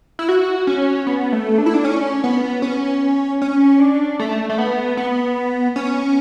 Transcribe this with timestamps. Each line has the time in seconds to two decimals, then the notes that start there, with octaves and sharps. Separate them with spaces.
0.19 E4
0.29 F#4
0.67 C#4
1.07 B3
1.32 A3
1.58 D4
1.66 E4
1.74 D4
1.85 C#4
2.24 B3
2.62 C#4
3.42 C#4
3.80 D4
4.19 A3
4.49 A3
4.58 B3
4.97 B3
5.76 C#4